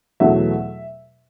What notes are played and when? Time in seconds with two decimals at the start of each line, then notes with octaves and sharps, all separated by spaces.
0.20 E2 B2 F#3 A3 E5